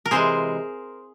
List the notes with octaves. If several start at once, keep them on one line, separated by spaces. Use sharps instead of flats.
A#4
C3 E3 G#3 G#4 C5